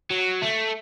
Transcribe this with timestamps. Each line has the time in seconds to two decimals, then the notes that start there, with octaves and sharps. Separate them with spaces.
0.11 F#3
0.42 A3